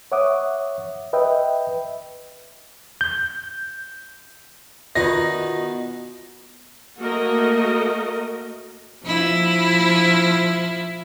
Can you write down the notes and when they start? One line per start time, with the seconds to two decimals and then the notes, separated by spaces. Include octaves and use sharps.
0.12 C#5 E5 F#5 D6 D#6
1.13 B4 D#5 E5 G5
3.01 G6
4.96 B2 D#3 B3 F4 D5 E5 A#6
7.00 A3 A#3 F#4 A#4 D#5
9.05 F3 E4